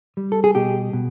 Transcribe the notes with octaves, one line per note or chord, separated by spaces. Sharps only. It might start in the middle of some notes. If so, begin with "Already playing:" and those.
G3
A4
G#4
B2 G4
B2